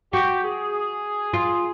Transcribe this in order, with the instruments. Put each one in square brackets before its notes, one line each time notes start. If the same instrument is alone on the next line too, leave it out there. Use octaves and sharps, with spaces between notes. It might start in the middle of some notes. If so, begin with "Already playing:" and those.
[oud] F#4 [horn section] G4
[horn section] G#4
[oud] F4